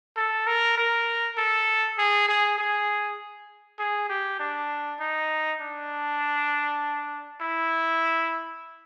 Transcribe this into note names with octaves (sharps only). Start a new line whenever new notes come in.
A4
A#4
A#4
A4
G#4
G#4
G#4
G#4
G4
D4
D#4
D4
E4